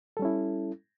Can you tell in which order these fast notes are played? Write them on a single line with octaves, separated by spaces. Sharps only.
A4 G3 C#4 E4